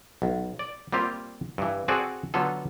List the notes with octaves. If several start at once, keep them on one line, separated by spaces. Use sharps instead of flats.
B1
D5
G3 A#3 C4 F4 G4
G2 E3
C4 F#4 G#4 A4 D5 F#5
D3 F#3 B3 F4 A4